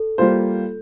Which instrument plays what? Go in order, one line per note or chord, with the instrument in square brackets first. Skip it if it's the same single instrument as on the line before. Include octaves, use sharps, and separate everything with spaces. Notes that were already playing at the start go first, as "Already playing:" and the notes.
Already playing: [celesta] A4
[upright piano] G3 A#3 F4 C5